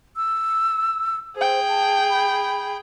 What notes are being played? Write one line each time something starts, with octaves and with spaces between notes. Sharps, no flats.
E6
G#4 C5 G5
A5
B5